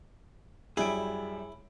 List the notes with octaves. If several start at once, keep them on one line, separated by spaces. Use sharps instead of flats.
F#2 G3 E4 G#4 D7